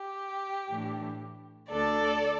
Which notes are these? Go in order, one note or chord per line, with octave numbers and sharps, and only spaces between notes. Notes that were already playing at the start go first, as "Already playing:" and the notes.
Already playing: G4
A2 E3 A3 D4
D2 D3 A3 D4 A4 D5